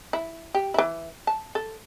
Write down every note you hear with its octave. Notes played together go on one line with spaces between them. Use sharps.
E4
G4
E3 E4
A5
A4